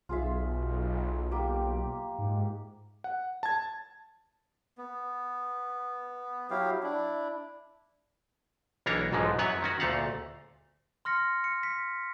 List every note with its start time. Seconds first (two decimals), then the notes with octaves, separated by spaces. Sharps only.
0.09 B1 F4 G#4 E5
1.31 A#3 G4 G5
2.18 G#2
3.04 F#5
3.43 A5 G#6
4.78 B3
6.51 F#3 E4 G4 F5
6.83 D4 E4
8.86 B1 E3 A#3 D4 C#5 A#5
9.12 B1 G#2 E3 F3 G#3
9.38 F#2 F#3 B3 C#5 F#5 G#5
9.62 D#3 C#4 F#4
9.80 D2 A#2 A3 F5 F#5
11.05 C6 F6 A#6 C#7
11.44 C#7
11.63 B6